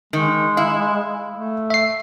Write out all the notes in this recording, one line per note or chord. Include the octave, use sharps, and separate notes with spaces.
D#3 G#3
E4 F5
A3
E5 C7